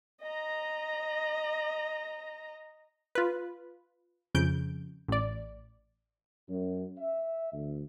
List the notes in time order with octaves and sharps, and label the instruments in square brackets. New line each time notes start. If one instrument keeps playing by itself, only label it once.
[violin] D#5 A#5
[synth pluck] F4 B4
F2 C#3 G6 D7
A1 D5
[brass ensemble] F#2
E5
D2